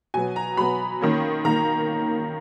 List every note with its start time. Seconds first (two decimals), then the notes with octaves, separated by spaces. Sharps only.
0.14 B2 F#3 B3 G#5
0.36 A#5
0.57 B2 F#3 B3 B5
1.01 D#3 A#3 C#4
1.45 D#3 A#3 A#5